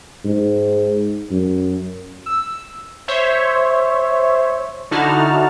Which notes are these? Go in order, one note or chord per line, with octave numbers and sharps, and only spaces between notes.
G#2
F#2
E6
C5 C#5 E5
D3 D#4 E4 F#4 A5 F6